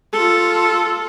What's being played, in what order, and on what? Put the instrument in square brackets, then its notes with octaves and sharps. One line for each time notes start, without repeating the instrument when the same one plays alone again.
[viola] F4 A4